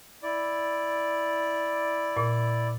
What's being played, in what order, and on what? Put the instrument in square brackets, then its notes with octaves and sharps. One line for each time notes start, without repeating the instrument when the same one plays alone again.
[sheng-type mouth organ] E4 D5
[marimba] A#2